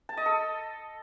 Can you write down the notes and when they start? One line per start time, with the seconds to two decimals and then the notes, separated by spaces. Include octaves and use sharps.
0.09 A5
0.17 D#5
0.26 A4